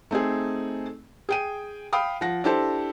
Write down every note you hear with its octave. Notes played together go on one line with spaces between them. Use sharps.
A3 C4 D#4 G#4
G#4 G5 D#7
F5 G5 B5 D#6
F3 F#5 A#6
D4 E4 G4 A4 C5 A5